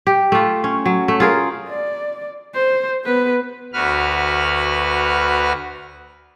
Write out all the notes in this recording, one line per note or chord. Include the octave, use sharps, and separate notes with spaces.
G4
A3 F4
C#4
F#3
A3
F4 G#4 A#4
D5
C5
B3 B4
D2 F#4 B4 F6